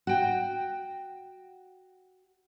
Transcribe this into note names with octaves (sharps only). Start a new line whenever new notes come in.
F#4 G5